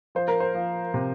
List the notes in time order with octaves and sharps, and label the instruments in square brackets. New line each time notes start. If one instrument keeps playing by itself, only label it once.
[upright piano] F3 C5
A#4
C5
F3
C3